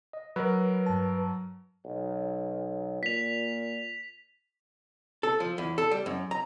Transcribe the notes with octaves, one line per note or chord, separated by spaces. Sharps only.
D#5
F#3 A#4 B4
G2 A5
B1
A#2 B6 F7
A4
F3
E2
A4
G3
F#2
A#5